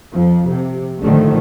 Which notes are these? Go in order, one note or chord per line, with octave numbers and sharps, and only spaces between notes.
F2 F3
C3
A#1 A2 D3 D#3 F3 A3